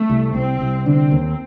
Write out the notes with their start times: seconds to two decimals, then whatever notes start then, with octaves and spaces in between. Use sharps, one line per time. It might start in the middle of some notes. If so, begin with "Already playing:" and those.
Already playing: A3
0.09 C2
0.35 C2 C4
0.60 C2
0.86 D3 C4
1.11 D#2